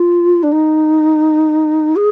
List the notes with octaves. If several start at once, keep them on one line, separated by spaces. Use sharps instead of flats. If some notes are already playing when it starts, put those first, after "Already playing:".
Already playing: F4
D4
D#4
G#4